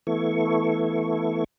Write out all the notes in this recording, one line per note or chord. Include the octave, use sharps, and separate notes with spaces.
E3 A3 B3 E4 A4 C#6